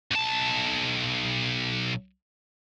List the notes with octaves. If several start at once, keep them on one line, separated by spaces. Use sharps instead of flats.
B1 A5